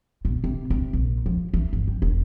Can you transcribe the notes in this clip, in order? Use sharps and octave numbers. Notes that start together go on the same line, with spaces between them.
B2
C3
C3
A#1
F3
E3
G1
F2
E1